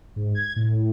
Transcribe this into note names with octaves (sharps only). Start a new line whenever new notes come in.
G#2
G#6
A2